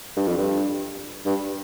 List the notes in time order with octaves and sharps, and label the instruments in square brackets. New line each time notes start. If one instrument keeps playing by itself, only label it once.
[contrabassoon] G2
F2
G2
G2